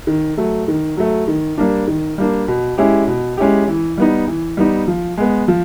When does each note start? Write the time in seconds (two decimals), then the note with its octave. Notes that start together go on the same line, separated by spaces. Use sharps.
0.07 D#3
0.37 F#3 A3
0.68 D#3
0.97 F#3 A3
1.28 D#3
1.58 G3 A#3 D4
1.88 D#3
2.18 G3 A#3 D4
2.48 B2
2.78 G#3 C#4 E4 G4
3.08 B2
3.38 G#3 C#4 E4 G4
3.68 E3
3.97 G3 B3 D#4
4.28 E3
4.57 G3 B3 D#4
4.88 F3
5.18 G#3 B3
5.48 F3